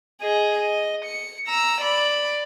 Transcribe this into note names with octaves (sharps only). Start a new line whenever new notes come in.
G#4 D#5
D#5
C#7
A#5 E6
D5 B5